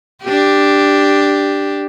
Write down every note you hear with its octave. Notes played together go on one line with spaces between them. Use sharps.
D4 G4